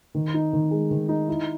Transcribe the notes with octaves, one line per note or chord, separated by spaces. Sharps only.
D#3
D#4
D#3
G#3
D#3
D#4
E4